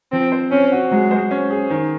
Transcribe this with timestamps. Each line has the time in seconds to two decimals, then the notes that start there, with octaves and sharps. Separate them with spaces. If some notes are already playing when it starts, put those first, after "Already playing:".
0.12 F3 C4
0.32 C5
0.51 C4 C#4
0.72 F#4
0.91 F#3 G#3
1.11 C5
1.31 C#4
1.51 G#4
1.70 D#3